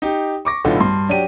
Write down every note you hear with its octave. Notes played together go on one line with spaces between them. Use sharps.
D#4 G4
C#6 D6 A#6
B1 A2 D3 F4
G2 C6
F#3 D4 G4 D#7